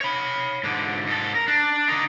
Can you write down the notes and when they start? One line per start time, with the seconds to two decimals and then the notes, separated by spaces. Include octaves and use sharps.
0.01 C#5 B5
0.63 G#2 D3
1.07 G#2 A4
1.35 A#4
1.48 D4
1.88 D3 D#4